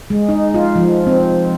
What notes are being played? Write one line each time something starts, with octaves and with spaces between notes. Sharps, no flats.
G#3
D#4
F4
F3
C4